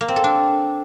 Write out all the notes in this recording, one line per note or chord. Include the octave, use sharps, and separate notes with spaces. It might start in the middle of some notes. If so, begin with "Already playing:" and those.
A#3
C4
A4
D4